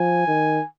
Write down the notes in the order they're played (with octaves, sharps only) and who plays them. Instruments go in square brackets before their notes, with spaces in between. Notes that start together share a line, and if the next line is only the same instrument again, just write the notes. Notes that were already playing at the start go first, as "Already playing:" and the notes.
Already playing: [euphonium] F3 [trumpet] G#5
[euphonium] D#3